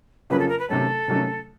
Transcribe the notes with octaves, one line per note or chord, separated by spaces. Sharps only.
F2 C#3 F#3 A#3 C#4 B4
A4
A#4
B4
C3 D#3 F#3 A3 C#4 A4
C3 D#3 F#3 A3 C#4